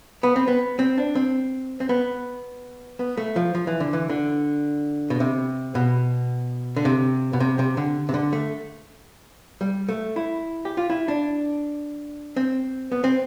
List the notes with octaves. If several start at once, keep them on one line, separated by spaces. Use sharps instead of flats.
B3
C4
B3
C4
D4
C4
C4
B3
B3
A3
F3
F3
E3
D3
E3
D3
B2
C3
B2
D3
C3
B2
C3
C3
D3
C3
D3
A3
G3
A3
E4
G4
F4
E4
D4
C4
B3
C4